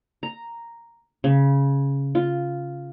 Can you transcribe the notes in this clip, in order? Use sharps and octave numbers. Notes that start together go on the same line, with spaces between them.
A#5
C#3
F4